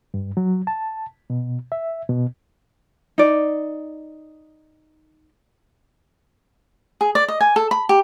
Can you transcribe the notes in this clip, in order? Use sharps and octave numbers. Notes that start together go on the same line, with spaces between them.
G2
F#3
A5
B2
E5
B2
D#4 D5
G#4
D5
D#5
G#5
A4
B5
G4